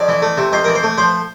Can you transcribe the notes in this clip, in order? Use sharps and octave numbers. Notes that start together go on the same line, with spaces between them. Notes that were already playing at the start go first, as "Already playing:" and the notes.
Already playing: F2 D5
E3
A3
C3
F2 C5
E3 A#4
C5
A3
F3 C5